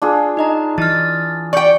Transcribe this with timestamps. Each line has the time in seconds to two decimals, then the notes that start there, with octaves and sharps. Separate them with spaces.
0.02 D4 F4 G#4
0.37 D#4 D#5 A#5
0.78 E3 F6 A6
1.53 D5 G5 C#6 C#7